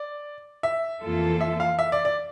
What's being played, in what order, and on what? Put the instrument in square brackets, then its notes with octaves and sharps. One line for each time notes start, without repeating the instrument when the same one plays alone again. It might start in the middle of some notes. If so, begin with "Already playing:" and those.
Already playing: [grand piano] D5
E5
[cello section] F2 E3 A#3 F4 A4
[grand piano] E5
F5
E5
D5
D5